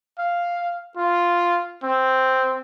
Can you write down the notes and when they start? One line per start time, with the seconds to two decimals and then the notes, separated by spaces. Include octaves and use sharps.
0.18 F5
0.97 F4
1.83 C4